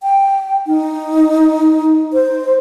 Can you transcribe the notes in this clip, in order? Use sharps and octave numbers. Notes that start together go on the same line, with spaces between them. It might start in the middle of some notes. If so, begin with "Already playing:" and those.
G5
D#4
C5